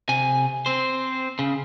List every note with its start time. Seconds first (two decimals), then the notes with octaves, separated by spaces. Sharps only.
0.09 C3 G#5
0.66 C4 C5
1.39 C#3